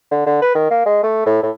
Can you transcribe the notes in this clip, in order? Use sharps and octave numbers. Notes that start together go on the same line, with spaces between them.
D3
D3
B4
D#3
A#3
G#3
A3
A2
A2